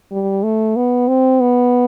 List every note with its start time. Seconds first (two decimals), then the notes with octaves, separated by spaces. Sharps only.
0.12 G3
0.43 A3
0.76 B3
1.08 C4
1.41 B3